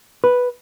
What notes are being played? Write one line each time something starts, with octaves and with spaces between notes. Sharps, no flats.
B4